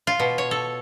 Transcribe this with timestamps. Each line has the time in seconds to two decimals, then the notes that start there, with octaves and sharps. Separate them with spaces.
0.07 F4
0.20 B2
0.38 C#5
0.51 A4